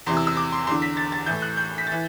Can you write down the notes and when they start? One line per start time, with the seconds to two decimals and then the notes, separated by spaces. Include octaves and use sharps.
0.06 E2 C3 E3 C6
0.17 E6
0.27 E6
0.37 D6
0.52 C6
0.67 E2 D3 C6
0.82 B6
0.97 A6
1.12 A6
1.26 A2 E3 G6
1.42 F#6
1.57 G6
1.78 B6
1.87 A6
1.91 E3